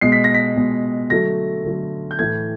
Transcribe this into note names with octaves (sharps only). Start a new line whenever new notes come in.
B2 G#3 C7
B6
A#6
B6
B2 G#3
D3 F#3 A3 A#6
D3 F#3 A3
G6
A2 E3 A3 G#6